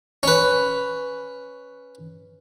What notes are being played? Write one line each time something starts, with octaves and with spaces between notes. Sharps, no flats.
C#4 B4